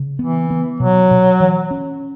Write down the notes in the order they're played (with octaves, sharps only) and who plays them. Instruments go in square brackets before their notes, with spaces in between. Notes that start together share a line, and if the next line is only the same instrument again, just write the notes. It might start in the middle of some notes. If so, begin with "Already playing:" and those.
Already playing: [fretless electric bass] C#3
[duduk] E3 [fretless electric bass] B3
[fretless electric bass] B3
[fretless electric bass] B2 [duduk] F#3
[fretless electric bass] B2
E3
C#4